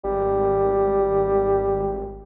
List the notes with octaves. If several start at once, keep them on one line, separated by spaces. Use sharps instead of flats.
G#1 G3